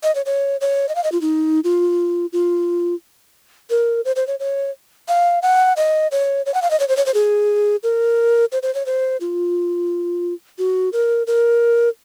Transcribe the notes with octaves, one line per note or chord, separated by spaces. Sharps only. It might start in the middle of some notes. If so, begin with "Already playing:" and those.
D#5
C#5
C#5
C#5
D#5
F5
D#5
F4
D#4
F4
F4
A#4
C5
C5
C#5
C#5
F5
F#5
D#5
C#5
C#5
F#5
F5
D#5
C#5
C5
C#5
C5
G#4
A#4
C5
C5
C#5
C5
F4
F#4
A#4
A#4